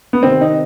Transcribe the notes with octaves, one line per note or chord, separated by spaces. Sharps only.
B3
C3 D#3 C4
D#4